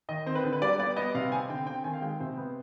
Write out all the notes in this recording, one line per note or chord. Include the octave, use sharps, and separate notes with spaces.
D#3 D#5
C4 C5
B4
D3
B4
G3 D5
B3 D5
B3 D#5
C3 F5
C4 G#5
D3 G5
C4 G5
D#3 G#5
F5
G#3 G5
C3 C5
B3